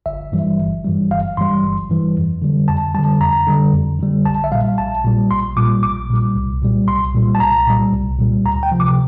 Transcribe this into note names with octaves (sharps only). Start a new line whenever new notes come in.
G1 E5
G2 E3 G3
G1
G2 E3 G3
G1 F5
G2 E3 G3 C6
G1
G2 E3 G3
F2
D3 G3
F2 A5
D3 G3 A5
F2 A#5
D3 G3
F2
D3 G3
A#1 A5
E5
A#2 G3 F5
A#1 A5
A#2 G3
A#1 C6
A#2 G3 D6
A#1 D6
A#2 G3
C2
A#2 G3
C2 C6
A#2 G3
A5
C2 A#5
A#2 G3
C2
A#2 G3
D2 A#5
G5
C3 F3
D6